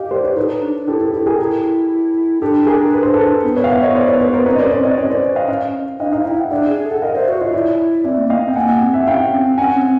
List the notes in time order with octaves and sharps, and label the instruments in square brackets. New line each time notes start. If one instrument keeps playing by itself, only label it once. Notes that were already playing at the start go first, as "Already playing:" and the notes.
Already playing: [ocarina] G4 [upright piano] D#5 F5 G5
[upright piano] C5 D5
B4 C#5
[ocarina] D#4 [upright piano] A4 B4
[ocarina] D4
[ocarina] E4 [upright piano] G4 A4
[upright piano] G4 A4
[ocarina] E4 [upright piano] G4 A4
[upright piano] G#4 A#4
[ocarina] E4 [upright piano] G4 A4
[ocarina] D4 [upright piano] G4 A4
[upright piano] G#4 A#4
B4
C5
A4 B4
[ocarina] B3
[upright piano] B4 C#5
F5
E5 F#5
C#5 D#5
C5 D5
B4 C#5
B4 C#5
A#4 C5
[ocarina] C4 [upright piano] B4 C#5
[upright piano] D#5
[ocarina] C#4 [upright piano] C5 D5
[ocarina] C4 [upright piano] C5 D5
[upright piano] C#5 D#5
[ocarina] C#4 [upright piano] C#5 D#5
[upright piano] C5 D5
D#5 F5
D#5 F5
[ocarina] D4 [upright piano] D#5 F5
[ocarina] D#4 [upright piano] D#5 F5
[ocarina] E4 [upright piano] F5 G5
[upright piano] E5 F#5
[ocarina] D4 [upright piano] D5 E5
[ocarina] G#4
A4
[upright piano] F#5
[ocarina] A#4 [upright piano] D#5 F5
[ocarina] C5 [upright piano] D5 E5
[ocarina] F#4
[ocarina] F4 [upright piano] C#5 D#5
[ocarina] E4 [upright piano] D5 E5
[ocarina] C4 [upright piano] D5 E5
[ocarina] A#3
[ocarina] B3 [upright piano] D#5 F5
[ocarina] C4
[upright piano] G5
[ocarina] A#3 [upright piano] F#5 G#5
[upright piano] F#5 G#5
[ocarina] C4
[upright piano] E5 F#5
[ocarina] C#4 [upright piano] F5 G5
[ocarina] C4
[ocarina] C#4 [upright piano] F#5 G#5
[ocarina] C4